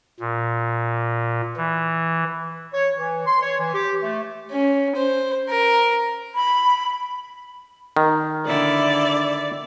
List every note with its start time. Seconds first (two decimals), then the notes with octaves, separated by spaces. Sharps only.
0.20 A#2
1.57 E3
2.72 C#5
2.97 E3
3.26 C6
3.41 C#5
3.58 E3
3.74 G4
4.02 A3
4.52 C#4
4.96 C5
5.49 A#4
6.35 B5
7.97 D#3
8.47 D3 E4 D5